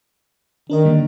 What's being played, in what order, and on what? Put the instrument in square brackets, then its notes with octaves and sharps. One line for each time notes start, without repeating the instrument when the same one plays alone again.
[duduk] D#3 [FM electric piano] D4 A#4 D#5
[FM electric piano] D3 G3 A#3